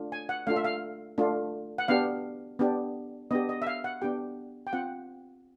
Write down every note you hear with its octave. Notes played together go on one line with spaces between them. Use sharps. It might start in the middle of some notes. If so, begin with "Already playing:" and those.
Already playing: A3 D4 F4
G#5
F#5
A3 D4 F4 F5
E5
F5
A3 D4 F4
F#5
B3 D4 G4 F5
B3 D4 G4
B3 D4 G4 D#5
D#5
E5
F5
F#5
B3 D4 G4 G5
G5
C4 F4 F#5